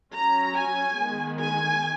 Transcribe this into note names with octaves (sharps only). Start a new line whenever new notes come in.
F#3 C#4 A#5
G#5
D#3 G#3 B3
G#5